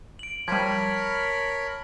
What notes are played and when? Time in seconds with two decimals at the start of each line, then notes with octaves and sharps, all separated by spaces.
0.19 D7 F#7
0.48 F3 G3 A#4 C#5 A5 B5 G#6